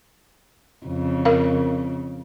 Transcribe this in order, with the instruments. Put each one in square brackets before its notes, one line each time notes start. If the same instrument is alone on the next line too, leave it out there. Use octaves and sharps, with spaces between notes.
[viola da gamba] F2 C#3
[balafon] A#4 F5